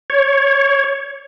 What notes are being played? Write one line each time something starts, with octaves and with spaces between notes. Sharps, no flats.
C#5